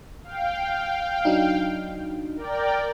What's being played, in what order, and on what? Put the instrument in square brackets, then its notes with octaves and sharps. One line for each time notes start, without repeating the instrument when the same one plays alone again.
[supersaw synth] F5 G5
[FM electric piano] F#3 D4 D#4
[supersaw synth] A#4 D5 G5